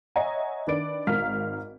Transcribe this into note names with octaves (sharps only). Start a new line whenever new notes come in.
C#5 D#5 E5 F#5 G#5 A#5
D#3 D4 B4 D5 D7
G#1 G#2 A#4 F5 F6 B6